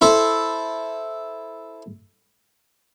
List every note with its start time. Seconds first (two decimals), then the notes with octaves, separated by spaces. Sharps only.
0.01 E4 A4 C5